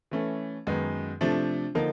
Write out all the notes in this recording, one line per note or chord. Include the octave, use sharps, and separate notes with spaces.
E3 A3 C#4
F#2 D#3 G#3 B3
C3 F3 A3 D4
D3 F3 A#3 D#4